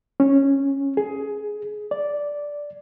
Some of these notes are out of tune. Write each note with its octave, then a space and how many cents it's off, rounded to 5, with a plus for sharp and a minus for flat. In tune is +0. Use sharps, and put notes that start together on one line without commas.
C#4 -10
G#4 +15
D5 -5